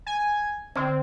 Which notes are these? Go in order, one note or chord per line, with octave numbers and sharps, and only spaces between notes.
G#5
D3 C4 G#6